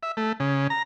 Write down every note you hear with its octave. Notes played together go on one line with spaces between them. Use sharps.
E5
A3
C#3
A#5